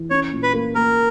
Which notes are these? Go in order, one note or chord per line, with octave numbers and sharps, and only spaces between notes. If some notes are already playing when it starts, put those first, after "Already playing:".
Already playing: E3
C#4 C#5
A#2
B4
A#3
A#3 A#4